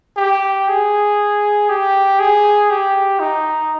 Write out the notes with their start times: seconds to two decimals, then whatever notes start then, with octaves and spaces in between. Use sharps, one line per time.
0.17 G4
0.68 G#4
1.69 G4
2.20 G#4
2.70 G4
3.20 D#4